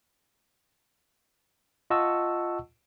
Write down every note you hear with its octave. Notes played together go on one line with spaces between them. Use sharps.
F4 D#5 F#5 A5 C#6 E6